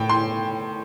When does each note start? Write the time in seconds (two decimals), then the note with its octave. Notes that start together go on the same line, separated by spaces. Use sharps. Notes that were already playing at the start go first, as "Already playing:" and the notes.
Already playing: A2 G5
0.09 C6